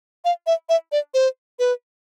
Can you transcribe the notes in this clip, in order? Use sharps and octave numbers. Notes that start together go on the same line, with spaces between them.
F5
E5
E5
D5
C5
B4